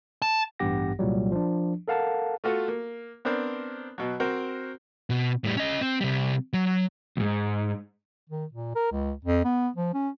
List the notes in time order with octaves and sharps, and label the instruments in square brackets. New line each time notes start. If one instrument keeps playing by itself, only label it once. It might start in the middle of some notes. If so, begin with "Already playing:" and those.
[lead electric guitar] A5
[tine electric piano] A1 G2 B3 G4 F#5 A#6
C2 A#2 F#3 G3
F3 D4
A4 A#4 F5 F#5 A5
[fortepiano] A3 F4 F#4 A4
A#3
B3 C4 D4 A#4 C5
B2 F#3
C4 F#4 A#4 C5
[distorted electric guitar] B2
A2 G3
C#4 D#5
C4
C3 G3
F#3
[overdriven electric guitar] D#2 G#2
[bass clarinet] D#3
A#2
A#4
C#2
F2
B3
F3
C#4